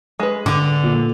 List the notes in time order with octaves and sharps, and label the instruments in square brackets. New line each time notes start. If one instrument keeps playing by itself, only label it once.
[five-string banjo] G#3 B4
[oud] D3 [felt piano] D6
[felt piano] A#2